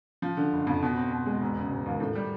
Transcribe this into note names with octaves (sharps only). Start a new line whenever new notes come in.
F3
D3
F#1
F2
B2
C4
B2
G#3
E1
C#3
E1
D#2
A2
G3